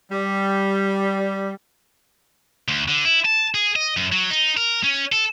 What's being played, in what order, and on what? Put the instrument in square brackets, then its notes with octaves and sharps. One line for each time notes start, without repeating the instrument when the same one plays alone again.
[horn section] G3
[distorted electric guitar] D2
D3
E4
A5
G#4
D#5
F#2
F#3
D#4
A#4
C#4
A4